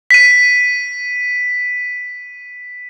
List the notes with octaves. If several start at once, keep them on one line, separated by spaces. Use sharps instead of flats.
B6 D#7